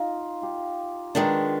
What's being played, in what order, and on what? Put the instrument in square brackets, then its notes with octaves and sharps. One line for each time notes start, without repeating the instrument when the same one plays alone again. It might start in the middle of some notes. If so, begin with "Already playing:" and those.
Already playing: [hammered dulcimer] D#4 F4
F4 G4
[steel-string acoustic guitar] D#3 G#3 B3 D4